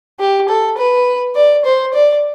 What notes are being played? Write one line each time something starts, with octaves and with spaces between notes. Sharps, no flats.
G4
A4
B4
D5
C5
D5